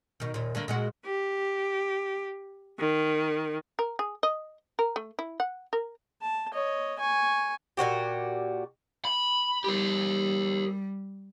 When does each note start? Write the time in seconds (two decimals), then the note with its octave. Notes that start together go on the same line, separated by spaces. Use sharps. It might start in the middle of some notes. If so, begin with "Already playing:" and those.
0.20 B2 D#3
0.34 D#2 A#2
0.55 D3 A3 A#3
0.68 A#2 G#3 F#4
1.05 G4
2.79 D#3
3.79 A#4
3.99 G#4
4.23 D#5
4.79 A#4
4.96 A3
5.19 E4
5.40 F#5
5.73 A#4
6.22 A5
6.53 C#5 D#5
6.99 G#5 C#6
7.77 A#2 E3 F#4 G4
9.05 B5
9.64 G3 G4 A#4